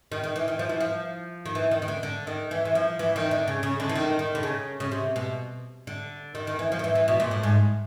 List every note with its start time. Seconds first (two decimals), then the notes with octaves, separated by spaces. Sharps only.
0.12 D#3
0.24 D#3
0.36 E3
0.48 D#3
0.59 F3
0.69 E3
0.80 F3
1.46 D#3
1.55 E3
1.71 D#3
1.82 D#3
1.88 D3
2.03 D3
2.27 D#3
2.51 E3
2.65 E3
2.75 F3
2.99 E3
3.16 D#3
3.31 D3
3.48 C#3
3.63 C#3
3.80 D3
3.89 E3
3.95 D#3
4.19 D#3
4.35 D3
4.43 C#3
4.80 C#3
4.92 C3
5.16 B2
5.87 D3
6.35 D#3
6.47 D#3
6.59 E3
6.72 F3
6.79 D#3
6.84 E3
6.95 E3
7.08 B2
7.20 A#2
7.31 A2
7.43 G#2